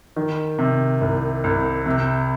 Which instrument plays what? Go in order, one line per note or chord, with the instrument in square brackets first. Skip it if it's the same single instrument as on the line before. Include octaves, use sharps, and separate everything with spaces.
[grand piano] D#3
C3
C2
C2
C3